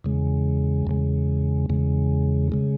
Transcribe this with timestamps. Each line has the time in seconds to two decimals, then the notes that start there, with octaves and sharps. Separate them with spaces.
0.04 E2 C#3 G#3
0.87 E2 C#3 G#3
1.70 E2 C#3 G#3
2.52 C#3 G#3